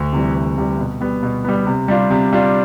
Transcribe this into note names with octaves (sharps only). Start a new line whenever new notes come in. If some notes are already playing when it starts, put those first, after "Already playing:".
Already playing: D2
C3 E3 G3
D2
C3 E3 G3
B2
G3 B3
B2
G3 B3
C3
G3 D4 F4
C3
G3 D4 F4